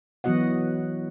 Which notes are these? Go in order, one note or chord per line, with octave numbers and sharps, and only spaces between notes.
E3 F#3 B3 F#4 D#5 F#5